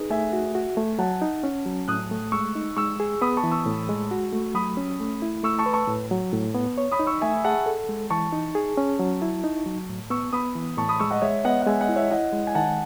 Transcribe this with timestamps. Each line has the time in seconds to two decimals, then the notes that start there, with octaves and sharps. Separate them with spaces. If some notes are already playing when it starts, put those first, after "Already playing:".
Already playing: D#4 G#4 B4
0.10 A3 E5 G#5
0.33 F#4
0.55 F#4
0.77 A3
0.99 F#3 F#5 A5
1.22 D#4
1.43 C#4
1.66 F#3
1.88 A2 D#6 F#6
2.11 A3
2.32 G#3 C#6 E6
2.55 D#4
2.76 G#3 C#6 E6
3.00 G#4
3.21 B3 B5 D#6
3.37 A5 C#6
3.44 E3
3.51 C#6 E6
3.66 A2
3.89 G#3
4.11 F#4
4.32 A3
4.54 F#3 B5 D#6
4.77 C#4
5.00 A3
5.22 E4
5.44 A3 C#6 E6
5.58 A5 C#6
5.66 B4
5.73 A5 C#6
5.88 A2
6.11 F#3
6.33 A2
6.55 B3
6.78 C#5
6.92 B5 D#6
6.99 D#4
7.07 C#6 E6
7.21 A3 E5 G#5
7.45 G#4 F#5 A5
7.66 A4
7.89 G#3
8.10 E3 A5 C#6
8.33 D#4
8.55 G#4
8.77 C#4
8.99 F#3
9.22 E4
9.44 D#4
9.66 F#3
9.89 A2
10.10 B3 C#6 E6
10.33 B3 B5 D#6
10.55 E3
10.77 A2 A5 C#6
10.89 B5 D#6
11.00 G#3 C#6 E6
11.11 D#5 F#5
11.22 G#3 C#5 E5
11.44 B3 D#5 F#5
11.62 F#5
11.66 G#3 E5 G#5
11.81 D#5 F#5
11.89 E4
11.96 C#5 E5
12.11 E4 D#5 F#5
12.33 G#3
12.47 G#5
12.55 D#3 F#5 A5